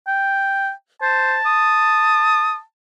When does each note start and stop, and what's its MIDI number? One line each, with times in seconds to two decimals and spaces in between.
0.07 0.71 79
1.02 1.36 72
1.02 2.62 81
1.46 2.56 87